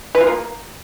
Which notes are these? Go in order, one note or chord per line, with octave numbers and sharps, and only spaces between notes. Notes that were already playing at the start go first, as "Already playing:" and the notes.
B4
F4
A#3